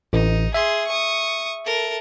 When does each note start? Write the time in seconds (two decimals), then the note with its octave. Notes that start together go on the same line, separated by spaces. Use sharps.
0.13 A1 D#4
0.54 G#4 E5 C6
0.87 C#6 D#6
1.65 A4 A#4